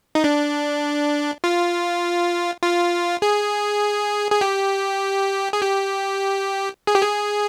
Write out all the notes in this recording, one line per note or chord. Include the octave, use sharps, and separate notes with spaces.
D#4
D4
F4
F4
G#4
G#4
G4
G#4
G4
G#4
G4
G#4